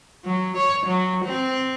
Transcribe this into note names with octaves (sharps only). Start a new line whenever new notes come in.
F#3
C#5
F#3
C4